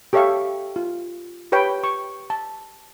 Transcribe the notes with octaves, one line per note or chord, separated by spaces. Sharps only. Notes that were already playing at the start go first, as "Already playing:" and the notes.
G4 A4 C#5 E5 F5 C#6
F4
G4 B4 C#5 G5 B5
C#6
A5